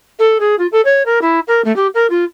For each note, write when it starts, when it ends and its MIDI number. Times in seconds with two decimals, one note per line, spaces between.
0.19 0.38 69
0.40 0.55 68
0.59 0.67 65
0.72 0.81 69
0.85 1.03 73
1.06 1.19 70
1.21 1.40 64
1.47 1.61 70
1.65 1.74 57
1.76 1.87 67
1.94 2.07 70
2.10 2.24 65